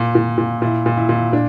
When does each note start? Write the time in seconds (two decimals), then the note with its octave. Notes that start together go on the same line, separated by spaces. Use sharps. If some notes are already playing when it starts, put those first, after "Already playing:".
Already playing: A#2
0.15 A#2
0.38 A#2
0.62 A#2 E4
0.86 A#2
0.97 E4
1.09 A#2
1.33 A#2 D4